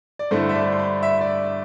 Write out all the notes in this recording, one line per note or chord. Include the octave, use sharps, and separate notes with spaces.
D5
G2 D3 A3 E4 C5
E5
D5
C6
B5
E5
D5